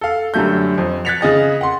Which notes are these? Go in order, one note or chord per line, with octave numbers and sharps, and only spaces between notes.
A4 F5
F#2 D3 G3 A3 G6
F2
F#6 G#6 A6 B6 C#7 F7
C#3 G#4 D#5 A6
F#5 C6